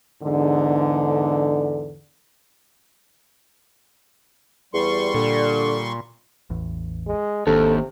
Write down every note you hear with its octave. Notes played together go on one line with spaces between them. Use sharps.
E2 G#2 D3
E2 G3 C6 C#6
A#2 D3
A1 E2
G#3
G#1 D#2 C3 D4 A4